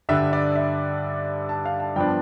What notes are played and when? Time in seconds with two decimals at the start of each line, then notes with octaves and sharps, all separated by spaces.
0.09 G2 D3 G3 D4 E5
0.33 D5
0.55 E5
1.49 A5
1.65 F5
1.80 A5
1.96 G2 F3 B3 D4 G5